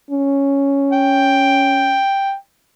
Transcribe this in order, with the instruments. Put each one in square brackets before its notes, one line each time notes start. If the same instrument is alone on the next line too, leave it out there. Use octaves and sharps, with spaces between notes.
[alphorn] C#4
[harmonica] G5